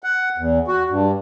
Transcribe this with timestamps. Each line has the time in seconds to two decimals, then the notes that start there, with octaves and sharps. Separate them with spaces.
0.04 F#5
0.38 E2
0.68 F#4
0.90 G2